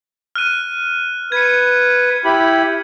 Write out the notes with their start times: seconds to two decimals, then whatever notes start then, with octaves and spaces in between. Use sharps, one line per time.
0.35 F6 F#6 D#7
1.32 B4 G#6 C#7
2.25 E4 G4 B5